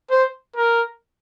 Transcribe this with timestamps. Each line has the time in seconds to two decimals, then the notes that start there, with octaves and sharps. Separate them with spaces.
0.11 C5
0.56 A#4